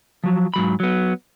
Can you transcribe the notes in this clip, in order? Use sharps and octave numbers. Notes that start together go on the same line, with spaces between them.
F3 F#3
G#2 F#3 B5
F#3 B3